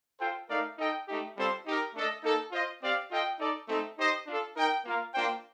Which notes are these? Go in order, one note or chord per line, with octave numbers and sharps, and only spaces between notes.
F4 A4 C5 G5
A3 D#4 A#4 D5 F5
D#4 A4 D#5 G5
A3 D#4 G4
G3 C4 F4 A4 C5
D#4 G4 A#4
A3 D4 A4 D#5
A#3 D#4 A4
F4 C5 D#5
C4 G4 D5 F5
F4 A4 D#5 G5
D#4 A4 D5
A3 C4 D#4 A4
D#4 G4 C5 D#5
D4 F4 A4
D#4 A#4 D#5 G5
A#3 F4 A#4 F5
A#3 D4 F4 C5 G5